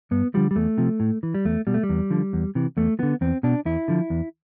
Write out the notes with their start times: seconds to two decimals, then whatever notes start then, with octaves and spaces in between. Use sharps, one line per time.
0.11 G2 B3
0.34 D3 F3 G3
0.51 G3
0.55 E2 A3
0.78 C3 F3
1.00 A2
1.23 E3
1.34 G3
1.45 E2 A3
1.67 B2 G3
1.74 A3
1.83 G3
1.89 E2
2.10 D3 F3
2.33 E2
2.55 C3 E3
2.77 E2 A3
2.99 D3 F3 B3
3.21 E2 C4
3.43 B2 D4
3.65 E2 E4
3.88 D3 F3
4.10 E2